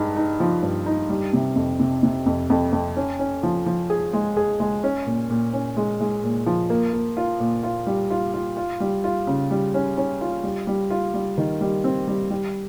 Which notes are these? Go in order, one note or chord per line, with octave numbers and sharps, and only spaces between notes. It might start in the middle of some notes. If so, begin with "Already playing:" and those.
Already playing: G2 G#3 D#4
D#4
F3
G2
D#4
G3
C3
F2
C3
C3
F2
F2
F2
C#4
C#4
F3
F3
G#4
G#3
G#4
G#3
C#4
A#2
A#2
C#4
G#3
G#3
A#2
F3
A#3
A#3
F4
A#2
F4
G3
F4
F4
F4
G3
F4
C#3
G3
C#4
C#4
F4
G3
G3
F4
G3
D#3
G3
C4
G3
G3